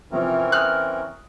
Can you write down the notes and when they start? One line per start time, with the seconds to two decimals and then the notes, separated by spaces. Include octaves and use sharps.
0.12 C3 E3 F3 C4 C#4 A#4
0.52 D#6 F6 F#6